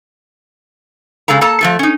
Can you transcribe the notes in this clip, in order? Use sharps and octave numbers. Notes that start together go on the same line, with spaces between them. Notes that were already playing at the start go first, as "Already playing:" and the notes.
C#3 G#3 A4 F5 A#5
A#3 A4 A5 A#5
F3 A3 A4
C#4 D#4